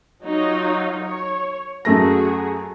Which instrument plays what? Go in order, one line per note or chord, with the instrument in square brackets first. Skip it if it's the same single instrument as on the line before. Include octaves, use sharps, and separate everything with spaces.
[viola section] F#3 D#4 F4
C#5
[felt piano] F#2 A3 A#6 [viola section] F#4 G#4